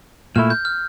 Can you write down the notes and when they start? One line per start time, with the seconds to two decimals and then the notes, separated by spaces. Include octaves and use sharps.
0.36 A#2 A3 E4 F6
0.50 G6
0.65 F6